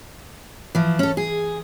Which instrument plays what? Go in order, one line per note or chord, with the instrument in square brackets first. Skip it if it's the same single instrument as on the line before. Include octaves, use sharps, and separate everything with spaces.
[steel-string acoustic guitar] E3 F3
C#4 A4
G#4